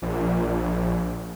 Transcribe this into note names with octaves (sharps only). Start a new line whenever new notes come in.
A#1